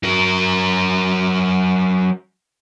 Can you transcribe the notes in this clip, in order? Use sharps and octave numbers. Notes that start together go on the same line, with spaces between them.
F#3 A#4